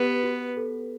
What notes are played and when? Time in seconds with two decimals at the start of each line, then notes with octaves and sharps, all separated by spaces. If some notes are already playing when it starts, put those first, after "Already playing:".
Already playing: B3 G4 B4
0.23 F#4
0.57 A4